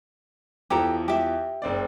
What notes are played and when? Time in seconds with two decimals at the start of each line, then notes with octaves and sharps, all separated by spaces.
0.70 E2 E3 F3 G4 A4 A#5
1.08 G4 E5
1.62 F#1 C4 D5